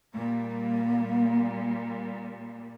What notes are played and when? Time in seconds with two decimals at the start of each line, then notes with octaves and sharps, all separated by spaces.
0.14 A#2 G3 A#3